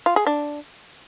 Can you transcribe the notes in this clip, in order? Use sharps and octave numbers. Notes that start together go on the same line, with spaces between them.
F4
G#4
D4